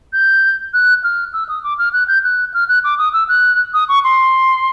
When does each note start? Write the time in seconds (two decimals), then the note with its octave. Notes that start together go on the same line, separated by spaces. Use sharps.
0.13 G6
0.74 F#6
1.04 F6
1.33 E6
1.49 D#6
1.63 D6
1.78 F6
1.93 F#6
2.08 G6
2.24 F#6
2.54 F6
2.68 F#6
2.84 D6
2.99 D#6
3.13 E6
3.29 F#6
3.74 D#6
3.89 C#6
4.04 C6